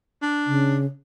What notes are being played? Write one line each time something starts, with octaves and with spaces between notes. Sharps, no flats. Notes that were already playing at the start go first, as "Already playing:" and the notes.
D4
C#3